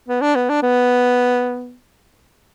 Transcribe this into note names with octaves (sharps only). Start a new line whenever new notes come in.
B3
D4
B3
D4
B3